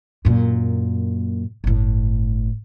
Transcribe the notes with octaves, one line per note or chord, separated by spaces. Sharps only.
F#2 A#2
G1 A2